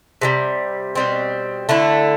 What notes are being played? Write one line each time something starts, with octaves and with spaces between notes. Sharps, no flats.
C3 E3 G3
B2 G3 C4
D3 A3 E4